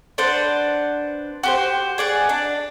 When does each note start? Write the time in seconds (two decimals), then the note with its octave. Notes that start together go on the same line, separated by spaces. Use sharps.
0.18 D4 B4 C5 F#5
1.43 F#4 G4 C5
1.98 G#4 D5 F#5
2.29 D4